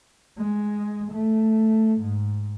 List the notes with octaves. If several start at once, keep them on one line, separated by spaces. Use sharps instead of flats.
G#3
A3
G#2